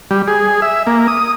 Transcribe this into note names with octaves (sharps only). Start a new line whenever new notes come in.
G3
G#4
E5
A#3
D#6